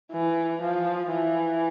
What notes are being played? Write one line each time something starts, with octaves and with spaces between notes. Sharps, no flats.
E3
F3
E3